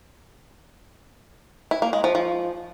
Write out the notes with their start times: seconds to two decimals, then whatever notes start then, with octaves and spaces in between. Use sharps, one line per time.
1.71 E4
1.82 A#3
1.93 G#3
2.04 F3
2.15 F3